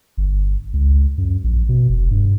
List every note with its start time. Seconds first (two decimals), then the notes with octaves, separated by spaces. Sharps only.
0.17 G1
0.73 C#2
1.18 F#2
1.44 A#1
1.69 B2
1.89 F1
2.11 G2